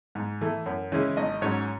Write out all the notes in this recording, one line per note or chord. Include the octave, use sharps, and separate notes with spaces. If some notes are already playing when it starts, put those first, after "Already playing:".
G#2
E3 A3
F#2
C#3 E3 G#3 C#4
G#1 D#5
G#2 F#3 C#4 C#5